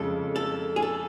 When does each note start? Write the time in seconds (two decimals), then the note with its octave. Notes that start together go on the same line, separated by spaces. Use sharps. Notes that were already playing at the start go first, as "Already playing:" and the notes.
Already playing: F2 C#3 G#3 A4
0.36 A4
0.76 G#4
0.82 A4